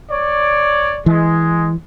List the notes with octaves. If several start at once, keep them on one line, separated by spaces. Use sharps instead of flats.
C#5 D5
E3 G#3